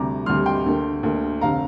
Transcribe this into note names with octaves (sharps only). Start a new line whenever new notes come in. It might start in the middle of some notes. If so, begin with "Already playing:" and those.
Already playing: D2 C3 G3 A#5 D6
D2 C3 G3 C6 F6
G5 C6
D2 D3 A#3
D2 D3 A#3
F1 D3 F5 A#5